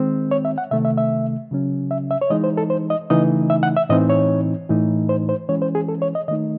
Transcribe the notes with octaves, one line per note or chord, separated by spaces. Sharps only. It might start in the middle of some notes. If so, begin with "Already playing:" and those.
Already playing: D#3 G#3 C4
C#5
E5
F#5
C3 D#3 A3 E5
E5
E5
C#3 F#3 C#4
E5
E5
C#5
E3 G#3 D#4 D#5
C5
A4
C5
D#5
C#3 E3 A3 D#4 D#5
E5
F#5
E5
A2 E3 C4 D#4 D#5
C#5
A2 E3 A3 D#4
C5
C5
E3 G#3 C#4 C#5
C5
G#4
A4
C#5
D#5
D#3 A3 D#4 D#5